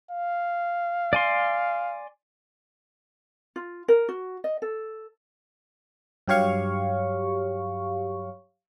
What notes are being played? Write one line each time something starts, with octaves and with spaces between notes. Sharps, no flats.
F5
D5 G#5 C6
F4
A#4
F#4
D#5
A4
G2 F#3 G4 C#5 F5 C#6